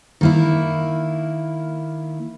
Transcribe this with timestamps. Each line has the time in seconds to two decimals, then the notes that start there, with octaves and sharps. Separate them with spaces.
0.21 D#3 A#3 E4